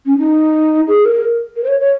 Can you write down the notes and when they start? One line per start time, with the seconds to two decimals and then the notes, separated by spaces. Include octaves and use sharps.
0.06 C#4
0.18 D#4
0.88 G#4
1.05 A#4
1.56 A#4
1.64 C5
1.68 C#5
1.80 C#5